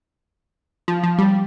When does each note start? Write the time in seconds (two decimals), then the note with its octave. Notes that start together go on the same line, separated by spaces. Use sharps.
0.88 F3
1.03 F3
1.18 G3